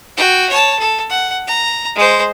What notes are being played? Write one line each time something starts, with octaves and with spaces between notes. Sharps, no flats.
F#4 G5
C#5 A5
A4
F#5
A#5
G#3 C5